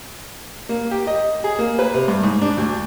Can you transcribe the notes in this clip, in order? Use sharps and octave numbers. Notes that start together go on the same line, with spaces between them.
A#3
G4
D#5
G#4
A#3
B4
C3
G2
G#2
D4
D2